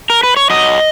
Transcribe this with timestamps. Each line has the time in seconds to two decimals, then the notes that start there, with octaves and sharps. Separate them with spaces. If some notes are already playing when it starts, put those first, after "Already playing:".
0.10 A#4
0.23 B4
0.37 C#5
0.50 F#3 D#5